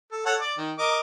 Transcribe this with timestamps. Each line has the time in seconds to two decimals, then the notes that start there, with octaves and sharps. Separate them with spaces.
0.12 A4
0.26 A4 C#5 F#5
0.40 D5
0.57 D#3
0.79 A#4 D#5 D6